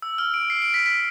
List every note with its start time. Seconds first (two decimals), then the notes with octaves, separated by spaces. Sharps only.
0.02 E6
0.18 F6
0.34 D7
0.50 C7
0.62 D7
0.74 B6
0.86 B6